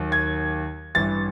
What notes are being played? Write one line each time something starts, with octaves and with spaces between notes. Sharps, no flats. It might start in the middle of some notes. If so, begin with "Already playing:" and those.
Already playing: D#2 D#3 F#3
G#6
A1 G2 E3 A6